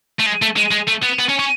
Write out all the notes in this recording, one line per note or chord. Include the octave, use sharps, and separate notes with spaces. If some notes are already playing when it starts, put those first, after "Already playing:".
A3
G#3
A3
G#3
G#3
A3
B3
B3
C#4
C#4